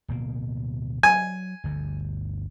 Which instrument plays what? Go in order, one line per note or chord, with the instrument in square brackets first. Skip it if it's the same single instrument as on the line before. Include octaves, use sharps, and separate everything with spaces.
[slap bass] D1 B2 A#3
[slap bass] F#3 [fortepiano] G#5
[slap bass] G1 D2 G2